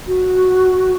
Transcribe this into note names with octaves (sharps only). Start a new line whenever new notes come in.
F#4